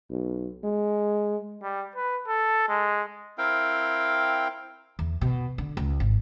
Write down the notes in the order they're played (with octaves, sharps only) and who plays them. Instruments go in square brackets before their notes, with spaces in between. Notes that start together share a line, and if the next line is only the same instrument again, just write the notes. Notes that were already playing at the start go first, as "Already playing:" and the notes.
[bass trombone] B1
G#3
[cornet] G3
B4
A4
G#3
[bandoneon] C4 E4 A#4 F5 G5
[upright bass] E2
B2
D3
C#2
G#1